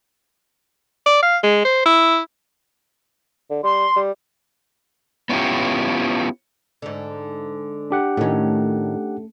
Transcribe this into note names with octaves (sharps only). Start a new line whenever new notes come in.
D5
F5
G#3
C5
E4
D3
G3 C6
G3
B3 C#4 E4 F4 G4
G#2 D3
D4 G4 F#5
A2 D#3 A3 C#4